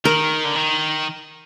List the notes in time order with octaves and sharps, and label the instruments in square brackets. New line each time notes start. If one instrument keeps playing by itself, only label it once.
[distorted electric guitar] D#3 [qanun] A#4
[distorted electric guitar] D3
D#3